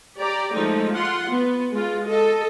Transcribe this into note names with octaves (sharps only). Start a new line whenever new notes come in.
G4 D5 A#5
F3 G#3 A3 D#4
F4 F#5 C6
B3
G#3 F4
A4 D#5